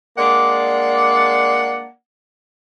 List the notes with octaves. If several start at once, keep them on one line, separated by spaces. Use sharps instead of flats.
G#3 A#3 D4 D5 F#5